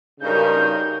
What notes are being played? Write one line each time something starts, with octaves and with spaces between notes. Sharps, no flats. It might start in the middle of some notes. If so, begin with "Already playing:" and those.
G2 C#3 D#4 F#4 A#4 G6